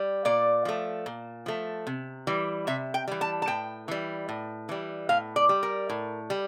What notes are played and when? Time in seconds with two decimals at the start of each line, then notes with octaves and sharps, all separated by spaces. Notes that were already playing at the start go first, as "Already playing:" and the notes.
Already playing: G3
0.25 A#2 D5
0.65 F3 A3
1.06 A#2
1.46 F3 A3
1.87 C3
2.27 E3 G3
2.67 C3 E5
2.94 G5
3.08 E3 G3
3.21 A5
3.42 A5
3.47 A2 G5
3.88 E3 G3
4.29 A2
4.69 E3 G3
5.09 A2 F5
5.36 D5
5.49 G3
5.63 A#4
5.90 A2
6.30 G3